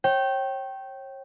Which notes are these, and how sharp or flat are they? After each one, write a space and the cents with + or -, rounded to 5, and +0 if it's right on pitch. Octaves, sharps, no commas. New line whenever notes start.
C#5 -35 G5 -15